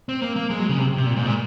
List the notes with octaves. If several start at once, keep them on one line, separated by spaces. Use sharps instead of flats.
C4
A#3
A#3
G#3
F#3
C#3
C3
C3
A#2
G#2
A#2